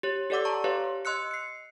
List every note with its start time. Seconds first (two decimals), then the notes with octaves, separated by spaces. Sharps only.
0.03 G4 C#5
0.30 G4 A4 D5 F#5 D6 E6
0.45 A5 A#5 C#6
0.64 G4 B4 C#5 F5
1.05 D#5 C6 E6 F#6 C#7
1.31 C7 C#7